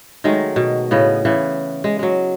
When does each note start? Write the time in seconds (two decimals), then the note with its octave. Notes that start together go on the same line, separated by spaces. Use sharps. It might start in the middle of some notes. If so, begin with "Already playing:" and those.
0.24 D#3 F#3 G#3 A3
0.56 B2
0.91 A2 C#3 B3 D#5
1.25 C#3 E3 B3
1.84 G#3
1.99 F#3 G#3